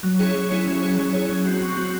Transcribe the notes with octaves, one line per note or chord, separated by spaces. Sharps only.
F#3
C#4 E4 G#4 C#5
F#3
C#4 E4 G#4 C#5
F#3
C#4 E4 G#4 C#5
F#3
C#4 E4 G#4 C#5
F#3
C4 F#4
F#3
C4 F#4